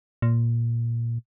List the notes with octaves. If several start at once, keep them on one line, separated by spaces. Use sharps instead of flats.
A#2